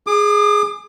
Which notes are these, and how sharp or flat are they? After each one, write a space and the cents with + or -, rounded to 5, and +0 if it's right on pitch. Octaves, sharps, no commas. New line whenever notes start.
G#4 +0 D6 +40